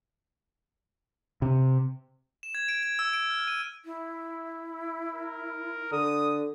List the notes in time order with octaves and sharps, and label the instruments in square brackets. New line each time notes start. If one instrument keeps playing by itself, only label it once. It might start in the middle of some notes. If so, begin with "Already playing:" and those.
[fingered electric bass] C3
[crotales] E7
G#6
D7
G#6
E6
D7
F6
D#7
[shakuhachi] E4
[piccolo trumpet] A#4
[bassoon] D3 [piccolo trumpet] D#6